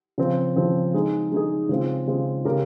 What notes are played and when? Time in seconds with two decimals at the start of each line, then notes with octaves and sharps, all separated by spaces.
0.18 C#3 F3 C4
0.56 C#3 F3 C4
0.94 G#3 D#4 G#4
1.32 G#3 D#4 G#4
1.69 C#3 G#3 C4 F4
2.07 C#3 G#3 C4 F4
2.45 C#3 G#3 C#4 G4 A#4